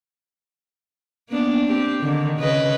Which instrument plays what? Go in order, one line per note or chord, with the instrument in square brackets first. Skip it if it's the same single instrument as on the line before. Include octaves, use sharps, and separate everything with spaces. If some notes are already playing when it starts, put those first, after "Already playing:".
[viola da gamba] A#3 B3 D4
C4 G4
D3 D#3
C#3 B4 D#5